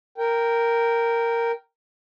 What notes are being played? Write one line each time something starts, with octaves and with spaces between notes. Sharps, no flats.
A#4 G5